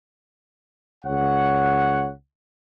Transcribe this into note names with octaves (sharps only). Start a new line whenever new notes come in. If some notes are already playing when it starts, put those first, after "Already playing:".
C#2 C#5 F#5